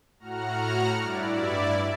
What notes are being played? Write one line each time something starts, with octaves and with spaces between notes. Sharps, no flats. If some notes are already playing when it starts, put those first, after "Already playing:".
A2 F#4 F#5 A#5 F6
G2 E4 D5